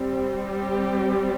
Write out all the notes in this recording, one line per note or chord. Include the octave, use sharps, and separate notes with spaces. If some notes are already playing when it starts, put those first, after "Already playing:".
Already playing: G3 C4
G4